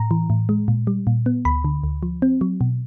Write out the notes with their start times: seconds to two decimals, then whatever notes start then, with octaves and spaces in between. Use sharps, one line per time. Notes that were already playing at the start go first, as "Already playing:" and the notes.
Already playing: A2 A#5
0.11 E3
0.30 A2
0.49 G#3
0.68 A#2
0.87 G3
1.07 A#2
1.26 B3
1.45 D2 B5
1.64 D3
1.84 D2
2.03 F3
2.22 C4
2.41 F#3
2.61 B2